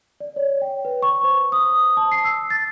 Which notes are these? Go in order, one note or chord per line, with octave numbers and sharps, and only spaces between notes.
D5
C#5
G5
B4
C#6
C5
D#6
A5
C7
E6
A6